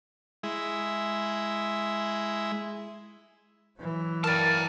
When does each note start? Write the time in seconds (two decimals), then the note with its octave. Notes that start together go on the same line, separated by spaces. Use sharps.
0.43 G#3 E4
3.79 E3 F#3
4.24 A#4 D5 G5 A5 F6